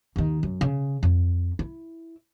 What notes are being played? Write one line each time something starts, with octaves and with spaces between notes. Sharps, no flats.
D#2 D#3
F#2
C#3
F2
E4